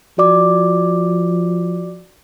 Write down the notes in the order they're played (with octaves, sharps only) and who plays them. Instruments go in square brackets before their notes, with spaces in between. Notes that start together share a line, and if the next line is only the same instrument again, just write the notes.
[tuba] F3 [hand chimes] F#4 D5 D6